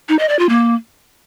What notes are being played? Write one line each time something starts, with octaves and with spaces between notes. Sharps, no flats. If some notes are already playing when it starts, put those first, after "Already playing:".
D#4
D#5
D5
F4
A#3